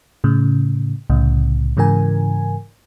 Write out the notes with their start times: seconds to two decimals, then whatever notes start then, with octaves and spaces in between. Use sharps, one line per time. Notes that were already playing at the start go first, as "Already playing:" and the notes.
0.24 A2 C#3
1.10 C2 A2 C#3
1.77 G#2 C#3 E3 A#4 G#5